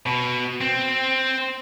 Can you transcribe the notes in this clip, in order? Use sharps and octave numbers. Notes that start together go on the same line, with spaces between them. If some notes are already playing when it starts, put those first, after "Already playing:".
B2
C4